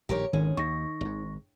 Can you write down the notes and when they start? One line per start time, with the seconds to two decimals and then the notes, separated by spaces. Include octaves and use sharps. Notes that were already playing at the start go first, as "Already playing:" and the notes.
0.09 A#1 A#2 D#3 G4 A#4 C#5
0.33 G#1 D2 D#3 C#4 G#4
0.57 D#2 D#3 C#6 A#6
1.01 G#1 G#2